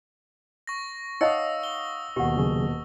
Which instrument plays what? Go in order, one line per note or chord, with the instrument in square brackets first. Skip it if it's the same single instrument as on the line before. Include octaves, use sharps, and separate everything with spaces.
[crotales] C#6 A#6
[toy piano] D#4 C#5 D#5 [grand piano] F5 F#5 C#7 [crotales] D#6 E6
[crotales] G7
[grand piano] D#1 D#2 B2 [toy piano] G4 F#5
[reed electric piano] C#3 F#3 G#4